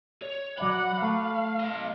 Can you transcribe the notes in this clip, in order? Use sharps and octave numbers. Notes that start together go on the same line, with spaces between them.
C#5
F#3 D5 F#5 B5
A3 F5
F#3 D#5